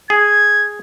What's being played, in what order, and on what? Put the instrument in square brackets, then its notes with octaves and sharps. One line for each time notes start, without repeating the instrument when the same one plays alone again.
[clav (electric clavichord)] G#4 [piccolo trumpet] G#6